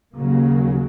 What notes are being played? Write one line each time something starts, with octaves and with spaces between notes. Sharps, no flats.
D#2 C#3 F#3 A#3